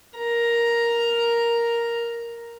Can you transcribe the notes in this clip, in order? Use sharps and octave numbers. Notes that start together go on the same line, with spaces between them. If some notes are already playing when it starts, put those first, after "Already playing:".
A#4 A#5